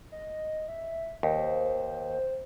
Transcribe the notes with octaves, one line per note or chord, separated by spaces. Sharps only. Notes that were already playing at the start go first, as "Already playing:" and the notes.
D#5
E5
D#2 C5